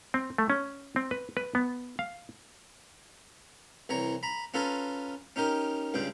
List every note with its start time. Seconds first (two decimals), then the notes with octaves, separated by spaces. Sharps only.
0.14 C4
0.38 A3
0.50 C#4
0.96 C4
1.11 B4
1.37 B4
1.55 B3
1.99 F5
3.89 C2 E3 C#5 A#5
4.23 A#5 B5
4.54 C#4 F4 A4 B4 G#5 A#5
5.36 C#4 D#4 G4 A#4
5.94 C#2 G2 C#3 G5